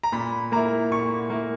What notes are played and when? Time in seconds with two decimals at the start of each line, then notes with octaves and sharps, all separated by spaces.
0.03 A#5
0.12 A#2 B5
0.52 A#3 E4 A#5
0.91 A#2 C#6
1.30 A#3 E4